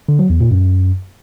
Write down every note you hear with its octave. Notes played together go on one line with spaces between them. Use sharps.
D3
F#3
E2
A#2
F#2